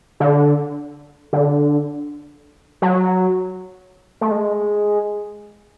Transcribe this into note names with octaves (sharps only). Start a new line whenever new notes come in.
D3
D3
F#3
A3
G#3